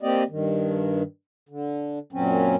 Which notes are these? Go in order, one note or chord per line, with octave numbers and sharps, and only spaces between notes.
A#3 C4 G4 D5 D#5
G2 D#3
D3
F#2 A#2 F#3 C4 C#4